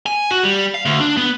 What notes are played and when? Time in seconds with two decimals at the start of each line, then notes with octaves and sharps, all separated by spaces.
0.06 G#5
0.31 F#4
0.43 G3
0.74 F5
0.85 D2
1.00 D4
1.17 B3